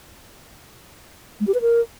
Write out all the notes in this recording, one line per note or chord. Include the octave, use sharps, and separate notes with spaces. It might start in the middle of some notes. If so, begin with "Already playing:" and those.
G#3
G4
B4
A#4